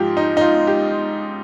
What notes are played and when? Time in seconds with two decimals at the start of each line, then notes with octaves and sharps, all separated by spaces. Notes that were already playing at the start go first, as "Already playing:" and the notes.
Already playing: G#2 F3 F4 G4
0.17 D#4
0.37 D#4
0.41 F4
0.67 G4